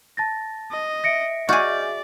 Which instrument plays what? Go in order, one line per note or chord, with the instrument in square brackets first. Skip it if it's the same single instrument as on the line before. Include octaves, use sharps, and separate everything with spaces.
[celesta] A5 A6 A#6
[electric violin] D#5
[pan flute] E5 [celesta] A#6 C#7 D7
[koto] F#4 G#4 [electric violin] D5 [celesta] D#5 F6 G6